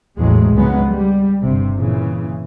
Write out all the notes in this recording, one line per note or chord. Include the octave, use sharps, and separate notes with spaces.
A1 E2 A2 F#3 G#3
C#2 G#2 C#3 F#3 G#3 B3
G3
G1 C3
A#2 C#3 E3